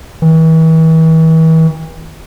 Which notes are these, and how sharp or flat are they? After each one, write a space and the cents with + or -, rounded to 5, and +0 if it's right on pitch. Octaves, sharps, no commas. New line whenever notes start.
E3 -40